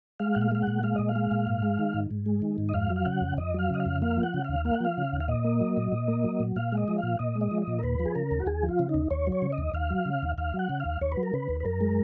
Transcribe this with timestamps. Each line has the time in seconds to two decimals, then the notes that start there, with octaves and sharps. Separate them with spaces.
0.20 G#3 F5
0.35 A#2 F#5
0.41 F5
0.52 G#3 F5
0.62 F#5
0.67 A#2
0.83 G#3 F5
0.96 A#2 D#5
1.09 F5
1.16 G#3
1.31 A#2
1.47 G#2
1.63 G#3
1.79 D#3
1.94 G#2
2.11 G#2
2.26 G#3
2.42 D#3
2.58 G#2
2.69 D#5
2.74 F2 F5
2.90 F#3
2.96 F5
3.05 C#3 F#5
3.21 F2
3.37 F2 D#5
3.54 F#3 F5
3.70 C#3 D#5
3.80 F5
3.86 F2
4.02 A#3 F5
4.17 F3
4.23 F#5
4.34 C#3
4.44 D#2 F5
4.65 A#3 F5
4.74 F#5
4.80 F3 F5
4.97 C#3
5.13 D#2
5.20 F5
5.28 A#2 D#5
5.45 A#3
5.60 F#3
5.77 A#2
5.92 A#2
6.08 A#3
6.24 F#3
6.40 A#2
6.56 A#2 F5
6.72 G#3
6.77 D#5
6.88 F3
6.98 A#2 F5
7.19 A#2 D#5
7.35 G#3
7.41 D#5
7.51 F3
7.62 D#5
7.67 A#2
7.79 A#4
7.83 D#2 B4
7.99 F3
8.06 G#4
8.15 C#3 A#4
8.31 D#2
8.40 F#4
8.46 D#2 G#4
8.63 F3
8.69 F4
8.79 C#3
8.89 D#4
8.94 D#2
9.10 D#2 C#5
9.27 F#3
9.32 C#5
9.42 C#3
9.52 D#5
9.58 D#2
9.74 D#2 F5
9.90 F#3
10.05 C#3
10.23 D#2
10.38 D#2 F5
10.54 F#3
10.59 F#5
10.69 C#3
10.80 F5
10.85 D#2
11.01 D#2 C#5
11.12 B4
11.17 F#3
11.23 A#4
11.33 C#3 B4
11.49 D#2
11.60 B4
11.65 F#2 A#4
11.81 G#3